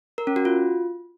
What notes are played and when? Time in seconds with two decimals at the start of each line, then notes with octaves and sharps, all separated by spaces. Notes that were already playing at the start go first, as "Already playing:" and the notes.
0.18 A#4
0.27 C#4
0.36 F#4
0.45 F4